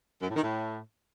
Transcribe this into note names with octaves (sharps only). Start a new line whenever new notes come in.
F#2
A2
D#3
A2